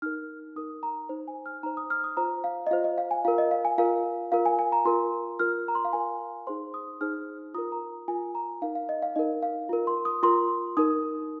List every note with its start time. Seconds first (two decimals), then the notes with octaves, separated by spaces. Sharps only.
0.02 D#4 A#4 F6
0.56 D#4 A#4 D#6
0.83 A#5
1.09 D#4 C5
1.28 G#5
1.46 F6
1.63 D#4 C5 A#5
1.77 D#6
1.90 F6
2.04 D#6
2.17 F4 C5 A#5
2.44 F5
2.67 D#5
2.71 F4 C5 F5
2.84 D#5
2.98 F5
3.11 G#5
3.25 F4 A#4 F5
3.38 D#5
3.51 F5
3.65 G#5
3.78 F4 A#4 F5
4.32 F4 A#4 F5
4.46 G#5
4.59 G#5
4.72 A#5
4.85 F4 A#4 C6
5.39 F4 A#4 F6
5.68 A#5
5.75 C6
5.85 F5
5.93 F4 A#4 G#5
6.47 D#4 G#4 C5 C6
6.74 D#6
7.01 D#4 G#4 C5 F6
7.54 F4 A#4 D#6
7.72 A#5
8.08 F4 A#4 G#5
8.35 A#5
8.62 D#4 A#4 F5
8.75 F5
8.89 D#5
9.02 F5
9.16 D#4 A#4 D#5
9.43 F5
9.69 F4 A#4
9.87 C6
10.05 D#6
10.23 F4 A#4 C6
10.77 D#4 A#4 D#6